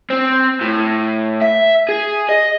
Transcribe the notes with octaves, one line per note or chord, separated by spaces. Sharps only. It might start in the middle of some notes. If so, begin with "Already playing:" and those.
C4
A2
E5
G#4
D#5